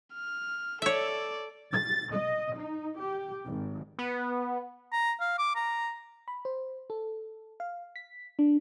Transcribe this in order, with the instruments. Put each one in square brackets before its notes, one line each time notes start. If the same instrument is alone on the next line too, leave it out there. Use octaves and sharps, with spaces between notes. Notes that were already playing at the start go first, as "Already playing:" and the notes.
[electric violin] F6
[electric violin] A4 D5 [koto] C#5 E5
[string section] A6
D#5
D#4
G4
G#1
[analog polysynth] B3
[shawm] A#5
F5
D6
A#5
[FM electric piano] B5
C5
A4
F5
B6
D4